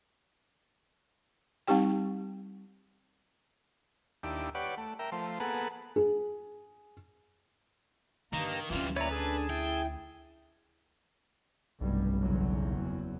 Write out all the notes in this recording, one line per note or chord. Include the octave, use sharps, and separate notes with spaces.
G3 C4 D#4 G4 G5
D#2 D4 E4 G4
G4 B4 C#5 D5 F#5
A3
A#4 E5 G5
F3 A3 C5
A#3 B3 G#4 A4 B4 F#5
G#4
G2 D3 D#3 A#3 A#5
D2 E3 G3 C#4 F4
A#2 E4 B4 C#5 D5 A#5
D4 G#4 A4 G#5 A5
E4 G5
F1 B1 G2 G3
F#1 E2 F#3